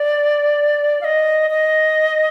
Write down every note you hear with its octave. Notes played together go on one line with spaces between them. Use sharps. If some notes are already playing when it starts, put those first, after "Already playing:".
Already playing: D5
F5
D#5
D#5